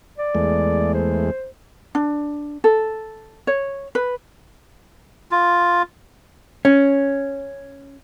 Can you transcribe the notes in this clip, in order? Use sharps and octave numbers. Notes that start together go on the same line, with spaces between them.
D5
E2 G#3 A3
C5
D4
A4
C#5
B4
F4
C#4